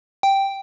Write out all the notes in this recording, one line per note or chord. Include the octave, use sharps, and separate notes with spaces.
G5